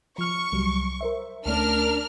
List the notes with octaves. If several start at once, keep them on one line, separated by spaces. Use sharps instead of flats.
F3 C#6 F6
C2 F#3 G3
A#4 C5 E5
D2 A3 C#4 D4 A#4 F6